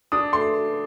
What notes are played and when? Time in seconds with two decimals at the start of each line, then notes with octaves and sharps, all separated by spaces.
0.12 D4 D#6
0.33 A3 C6